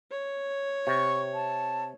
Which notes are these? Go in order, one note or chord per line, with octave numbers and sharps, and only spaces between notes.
C#5
C3 C#6
A5